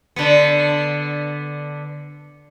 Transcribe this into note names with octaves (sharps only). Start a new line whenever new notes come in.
D3 B3